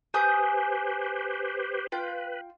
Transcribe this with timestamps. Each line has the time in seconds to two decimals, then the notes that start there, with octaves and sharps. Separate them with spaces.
0.14 G4 B4 C5 G#5 D#6 G6
1.92 F4 B4 G5